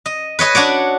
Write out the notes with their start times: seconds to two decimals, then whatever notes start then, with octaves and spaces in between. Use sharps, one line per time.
0.06 D#5
0.39 B4 C#5 D#5 G#5
0.55 D4 F#4 C#5 D5